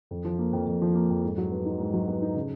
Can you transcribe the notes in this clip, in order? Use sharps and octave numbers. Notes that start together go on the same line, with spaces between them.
F2
F3
A#3
F2
F2
F3
A#3
F2
G#2
F#3
B3
D#4
G#2
F#3
B3
D#4
C#3